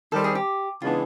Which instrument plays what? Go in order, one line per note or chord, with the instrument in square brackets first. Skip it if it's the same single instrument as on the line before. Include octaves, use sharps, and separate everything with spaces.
[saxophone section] D#3 G3 C4 [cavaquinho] A4
[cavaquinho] G#4
G4
[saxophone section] C#3 E3 G#3 B3 D4 [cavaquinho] F4